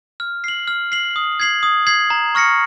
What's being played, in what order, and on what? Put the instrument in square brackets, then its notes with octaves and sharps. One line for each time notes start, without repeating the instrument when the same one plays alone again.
[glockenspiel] F6
C7 F#7
F6
C7 F#7
D#6
G#6 C7 F#7
D#6
G#6 C7 F#7
A#5
C#6 F6 A#6 C#7